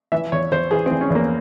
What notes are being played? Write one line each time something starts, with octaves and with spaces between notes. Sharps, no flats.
E3 E5
E2 C#5
E2 C5
E3 G#4
C4
E3
C#4
E2
A#3